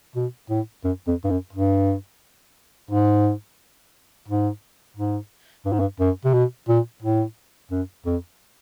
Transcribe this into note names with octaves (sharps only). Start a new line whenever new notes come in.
B2
A2
F#2
F2
G2
F#2
G2
G#2
G#2
G#2
G2
G#2
G2
F#2
C3
B2
A#2
A2
F#2
F2